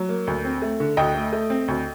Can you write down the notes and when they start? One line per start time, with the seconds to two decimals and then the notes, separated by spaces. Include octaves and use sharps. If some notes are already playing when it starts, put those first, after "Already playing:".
Already playing: F#3
0.09 A#3
0.27 D2
0.45 C4
0.62 A3
0.80 D3
0.97 D2 D#5 G5
1.15 A3
1.33 A3
1.50 C4
1.68 D2